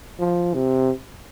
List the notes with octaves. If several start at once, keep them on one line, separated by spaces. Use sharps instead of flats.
F3
C3